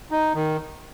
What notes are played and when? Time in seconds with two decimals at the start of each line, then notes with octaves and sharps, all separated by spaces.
0.11 D#4
0.35 D#3